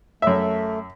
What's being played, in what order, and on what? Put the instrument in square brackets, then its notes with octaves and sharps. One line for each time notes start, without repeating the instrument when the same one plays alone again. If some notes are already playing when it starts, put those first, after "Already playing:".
[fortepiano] F#2 E5 [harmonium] A3